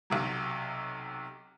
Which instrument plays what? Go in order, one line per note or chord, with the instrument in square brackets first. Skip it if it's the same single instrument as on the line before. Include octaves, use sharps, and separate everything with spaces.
[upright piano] B1 C3 F#3